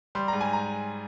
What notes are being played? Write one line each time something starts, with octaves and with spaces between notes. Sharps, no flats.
G3 C6
G#2 A#5
G#5
A#5